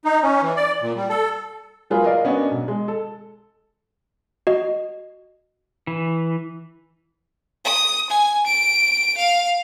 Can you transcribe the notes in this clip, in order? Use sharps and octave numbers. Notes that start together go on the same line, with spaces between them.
D#4
C#4
E3
D5
A#2
G3
A4
F#3 A#3 F4 G#4 B4
A#4 D5 D#5 F5
A#3 B3 C#4 D4 F#4 D#5
B1
G#3
A4
F#4 D#5
E3
D#6
G#5
D7
F5